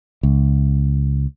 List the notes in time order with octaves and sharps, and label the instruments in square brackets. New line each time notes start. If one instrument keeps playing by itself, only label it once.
[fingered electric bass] C#2